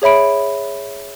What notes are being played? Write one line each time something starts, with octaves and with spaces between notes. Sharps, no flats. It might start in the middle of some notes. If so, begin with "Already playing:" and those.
G#4 C#5 E5 B5 D7